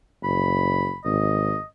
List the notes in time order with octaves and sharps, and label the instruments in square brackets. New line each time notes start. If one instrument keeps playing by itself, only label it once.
[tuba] F#1 [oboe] B5
[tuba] G#1 [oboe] D#5